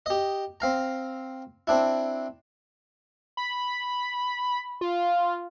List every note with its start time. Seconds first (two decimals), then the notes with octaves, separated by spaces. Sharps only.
0.06 G4 D#5
0.60 C4 F5 A#5
1.67 C4 D4 E4
3.37 B5
4.81 F4